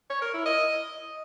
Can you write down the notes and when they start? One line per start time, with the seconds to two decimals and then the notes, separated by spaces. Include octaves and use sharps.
0.10 C#5
0.22 A#4
0.34 E4
0.46 D#5